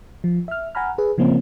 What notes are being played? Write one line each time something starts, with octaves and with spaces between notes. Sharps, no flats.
F3
E5 F6
F#5 G#5 A#5 B5 F6
G#4 B4
C#3 F3 A#3 C4 C#4